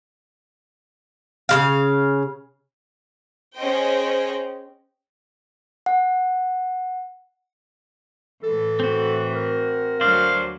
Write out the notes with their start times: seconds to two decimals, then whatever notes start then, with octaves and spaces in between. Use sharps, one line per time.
1.49 C#3 F#3 F5
3.57 C#4 G#4 C5 D#5 G5
5.86 F#5
8.43 A2 E3 A4
8.80 C4 F#4
9.35 A#4
10.01 D2 F#3 C5 D5 F5